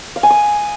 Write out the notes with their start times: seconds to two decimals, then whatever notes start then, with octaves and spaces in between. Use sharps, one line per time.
0.16 F5
0.23 G#5
0.30 D#6